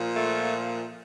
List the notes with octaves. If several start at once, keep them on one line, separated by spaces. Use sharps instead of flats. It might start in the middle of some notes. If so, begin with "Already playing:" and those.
Already playing: A#2 F3
A3